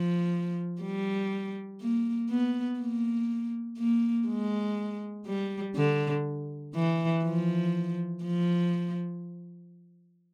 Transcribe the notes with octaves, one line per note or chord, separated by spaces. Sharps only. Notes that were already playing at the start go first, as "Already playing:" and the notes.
Already playing: F3
G3
A#3
B3
A#3
A#3
G#3
G3
D3
E3
F3
F3